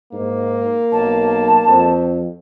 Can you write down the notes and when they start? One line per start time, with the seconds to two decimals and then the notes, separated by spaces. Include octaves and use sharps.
0.12 G#2 A#3
0.92 B1 A5
1.68 F2